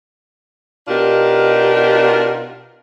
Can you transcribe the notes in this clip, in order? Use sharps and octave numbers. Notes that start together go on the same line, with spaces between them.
B2 D4 D#4 F4 G4 A#4